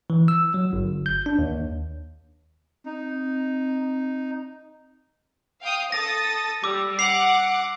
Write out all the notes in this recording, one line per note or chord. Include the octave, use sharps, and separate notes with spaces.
E3
E6
F#3
G1
G6
D4
D#2
C4 D#4
F5 G5 D#6
A4 D#6 A6 A#6
G3 D6 E6
F#5 D6 C7 F7